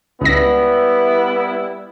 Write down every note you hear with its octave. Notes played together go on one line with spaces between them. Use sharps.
C#2 G3 B3 E4 A#6